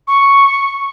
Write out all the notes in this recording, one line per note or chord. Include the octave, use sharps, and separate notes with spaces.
C#6